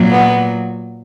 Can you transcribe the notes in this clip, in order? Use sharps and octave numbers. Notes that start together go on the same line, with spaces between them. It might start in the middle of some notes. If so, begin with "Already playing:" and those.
Already playing: A#2 F#3
B3